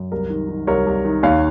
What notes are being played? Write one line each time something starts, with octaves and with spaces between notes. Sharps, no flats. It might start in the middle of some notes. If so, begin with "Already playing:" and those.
Already playing: F#2
C2 A#4
D#3
D#3
C2 A#4 C#5
C2
D#3
D#2 C#5 F5